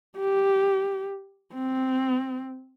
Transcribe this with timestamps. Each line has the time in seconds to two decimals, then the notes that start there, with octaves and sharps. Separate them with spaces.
0.17 G4
1.54 C4